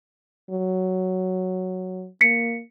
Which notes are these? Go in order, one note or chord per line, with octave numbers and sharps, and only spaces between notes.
F#3
A#3 B6 C#7